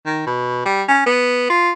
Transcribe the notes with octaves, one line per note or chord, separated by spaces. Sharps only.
D#3
B2
G3
C#4
B3
F4